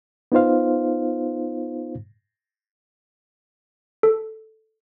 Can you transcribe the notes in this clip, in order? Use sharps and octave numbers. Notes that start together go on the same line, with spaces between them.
B3 D#4 F4 C5 F5
A4